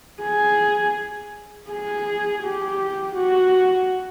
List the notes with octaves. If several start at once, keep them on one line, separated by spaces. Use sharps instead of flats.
G#4
G#4
G4
F#4